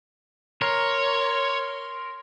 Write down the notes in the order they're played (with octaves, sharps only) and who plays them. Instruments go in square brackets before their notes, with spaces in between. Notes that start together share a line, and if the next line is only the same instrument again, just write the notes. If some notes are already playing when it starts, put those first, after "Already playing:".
[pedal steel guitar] A#4 [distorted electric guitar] C#5 [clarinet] C6